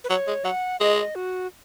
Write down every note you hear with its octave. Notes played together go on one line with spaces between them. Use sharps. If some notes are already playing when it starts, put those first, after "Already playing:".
B4
F#3 C#5
G#3
F#3 F#5
G#3 D#5
F#4